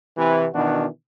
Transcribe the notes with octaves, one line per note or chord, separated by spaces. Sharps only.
C3 E3
B2 D#3 E3 D4 F#4